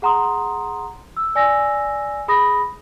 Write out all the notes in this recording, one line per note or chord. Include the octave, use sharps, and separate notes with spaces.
G#4 F#5 A#5 C6 D#6
E6
D5 G#5 E6 A#6
G#4 B5 D#6 A#6